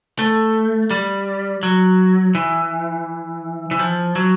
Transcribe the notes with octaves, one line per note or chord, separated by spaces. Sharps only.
A3
G3
F#3
E3
E3
F3
F#3